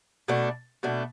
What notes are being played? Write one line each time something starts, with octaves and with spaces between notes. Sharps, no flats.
B2 A3 D4
B2 A3 D4